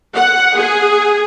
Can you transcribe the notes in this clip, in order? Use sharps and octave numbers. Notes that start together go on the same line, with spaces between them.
F#5
G#4